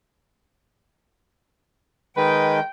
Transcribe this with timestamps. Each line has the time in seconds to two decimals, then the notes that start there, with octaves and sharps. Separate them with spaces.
2.17 D#3 G#3 B4 G5